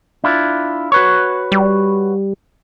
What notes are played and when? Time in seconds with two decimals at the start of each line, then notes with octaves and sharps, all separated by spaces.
0.24 D4 E4 F4
0.92 F#4 B4 C#5
1.52 G3